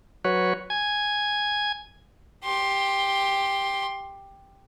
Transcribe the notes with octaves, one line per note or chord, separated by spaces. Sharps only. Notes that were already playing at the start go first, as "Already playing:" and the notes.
F#3 F#4 B4 C#5
G#5 G#6
G4 C6